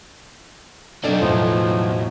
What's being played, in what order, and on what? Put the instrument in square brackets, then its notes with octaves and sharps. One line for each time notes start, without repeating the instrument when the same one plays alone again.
[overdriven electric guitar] F#3 D#4 [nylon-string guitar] D4 A4 D5
[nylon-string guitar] E2 A2 [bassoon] F3